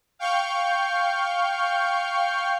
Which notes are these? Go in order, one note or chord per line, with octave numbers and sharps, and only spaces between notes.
F5 G5 C#6 F6 G6